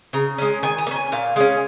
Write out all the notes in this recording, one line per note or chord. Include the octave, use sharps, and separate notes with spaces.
C#3 A#5
G#3 C#4
D#3 G#5
A#5
A#3
C#4 G#5
A#2 F5
G#3 C#4 F5